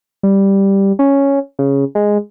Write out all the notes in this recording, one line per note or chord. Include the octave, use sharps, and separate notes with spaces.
G3
C#4
C#3
G#3